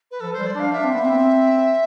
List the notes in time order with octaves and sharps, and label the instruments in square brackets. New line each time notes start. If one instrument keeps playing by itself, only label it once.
[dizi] B4
[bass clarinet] F3 [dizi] A4
[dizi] C5
[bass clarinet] G3
[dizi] D5
[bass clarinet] D4 [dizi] F5
[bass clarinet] D4 [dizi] E5
[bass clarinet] C4
B3
C4